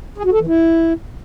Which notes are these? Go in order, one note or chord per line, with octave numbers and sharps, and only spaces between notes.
G#4
F#4
A4
E3
E4